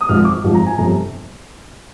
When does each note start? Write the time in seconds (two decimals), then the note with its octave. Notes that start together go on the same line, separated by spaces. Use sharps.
0.01 D#6
0.09 G#1 G#2 F3 F6
0.25 D6
0.44 G#1 G#2 F3
0.54 A#5
0.66 G#5
0.78 G1 F2 C3 A#5